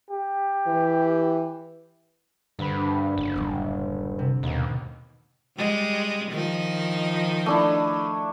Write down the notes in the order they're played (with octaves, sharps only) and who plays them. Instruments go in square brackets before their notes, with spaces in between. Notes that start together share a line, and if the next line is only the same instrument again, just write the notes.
[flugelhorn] G4
[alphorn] E3
[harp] D2 B5 [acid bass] G2
[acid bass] F#1 [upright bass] G#3
[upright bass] D1 G3
[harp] C3
[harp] G#1 B2 [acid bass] D#2
[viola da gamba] G3 G#3
D#3 F3 D#4
[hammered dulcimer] A3 D4 E4